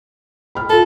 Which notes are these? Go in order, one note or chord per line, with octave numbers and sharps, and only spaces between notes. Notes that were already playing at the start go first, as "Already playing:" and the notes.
B5 F6
F4 A4 A5